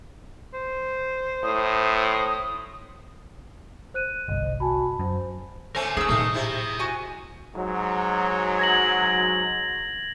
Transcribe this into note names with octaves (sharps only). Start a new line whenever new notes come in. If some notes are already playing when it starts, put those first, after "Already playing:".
C5
A2 D#6
C5 F#6 D#7
G1 C2 D#5
F#4 G#5 A5 B5
F#2 C5
A3 C4 C#4 A#4 G#5
C#3 D#4 G#4 E6
A1 A#2 D#3 F#3 A3 D#5
C3 E4
F#4 G#5
G#2 F#3
G#6 A#6 F#7